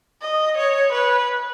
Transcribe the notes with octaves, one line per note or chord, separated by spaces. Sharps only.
D#5
C#5
B4